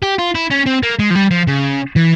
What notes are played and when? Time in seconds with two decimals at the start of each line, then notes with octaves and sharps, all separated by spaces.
0.03 G4
0.19 F4
0.35 E4
0.51 C#4
0.66 C4
0.83 A#3
0.99 G#3
1.11 F3
1.15 G3
1.31 F3
1.47 C#3
1.96 E3